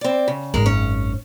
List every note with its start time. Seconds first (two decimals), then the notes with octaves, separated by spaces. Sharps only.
0.01 C4 D5
0.28 C#3
0.54 G#1 F#2 G#3 A#4
0.66 C#4